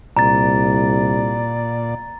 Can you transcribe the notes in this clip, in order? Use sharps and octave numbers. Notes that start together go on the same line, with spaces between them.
C2 A#2 D5 A#5 A6